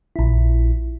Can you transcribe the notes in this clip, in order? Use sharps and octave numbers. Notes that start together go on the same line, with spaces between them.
A#1 E4